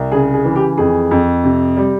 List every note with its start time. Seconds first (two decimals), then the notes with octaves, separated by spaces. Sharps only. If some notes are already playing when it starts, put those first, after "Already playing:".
Already playing: C2
0.12 C#3 G#4
0.34 G#4
0.45 E3
0.56 G4
0.78 F2 G#4
1.11 F2
1.44 C3
1.77 G3